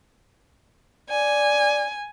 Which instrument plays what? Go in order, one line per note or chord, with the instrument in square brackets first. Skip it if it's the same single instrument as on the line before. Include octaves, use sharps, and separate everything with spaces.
[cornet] D5 [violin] G#5